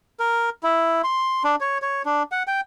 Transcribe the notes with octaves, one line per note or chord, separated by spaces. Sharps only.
A#4
E4
C6
D4
C#5
C#5
D4
F#5
G5